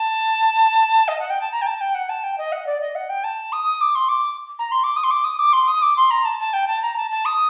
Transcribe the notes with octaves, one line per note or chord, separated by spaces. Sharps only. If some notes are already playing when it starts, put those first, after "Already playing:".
Already playing: A5
D#5
F#5
G5
A5
A#5
G5
A5
G5
F#5
A5
G5
D#5
F#5
D5
D#5
F#5
G5
A5
D#6
D6
C6
D6
A#5
C6
D6
D#6
C6
D6
D#6
D6
C6
D#6
D6
C6
A#5
A5
A5
G5
A5
A#5
A5
A5
D#6